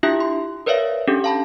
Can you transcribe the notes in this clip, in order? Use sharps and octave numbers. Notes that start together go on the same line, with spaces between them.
D4 E4 F4 G4 E5
C6
A#4 B4 C#5 D5 E5 F5
C#4 D4 G4 A4
F5 A5 B5